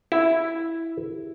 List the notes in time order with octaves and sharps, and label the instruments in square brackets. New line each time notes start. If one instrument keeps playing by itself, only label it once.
[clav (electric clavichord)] E4